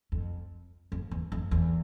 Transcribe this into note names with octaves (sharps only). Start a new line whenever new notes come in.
F2
F2
E2
F2
E2